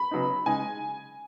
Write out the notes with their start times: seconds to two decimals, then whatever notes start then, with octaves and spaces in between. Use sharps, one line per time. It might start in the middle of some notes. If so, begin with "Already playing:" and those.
Already playing: B5
0.11 C#3 F#3 B3 D#4
0.46 C#3 G#3 D#4 G#5